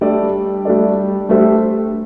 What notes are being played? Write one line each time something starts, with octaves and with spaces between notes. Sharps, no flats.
G3 A3 D4 A4 D5
A3 D4 A4 D5
G3 A3 D4 A4 C5 E5